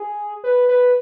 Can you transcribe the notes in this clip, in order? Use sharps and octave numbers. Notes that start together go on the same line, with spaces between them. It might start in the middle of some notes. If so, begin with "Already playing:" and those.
Already playing: G#4
B4
B4